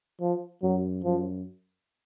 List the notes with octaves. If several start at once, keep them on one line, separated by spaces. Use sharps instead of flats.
F3
F#2 F#3
F#2 F3